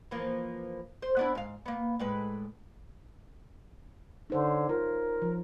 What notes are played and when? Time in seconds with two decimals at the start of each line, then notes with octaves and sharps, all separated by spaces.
0.11 E3 F3 A#3
1.02 C5
1.17 B3 D4 E4
1.35 G#2 F5
1.66 A#3 B3
1.99 A2 G#3 B4
4.30 D3 D#4 C5 C#5
4.69 F4 A#4
5.22 F3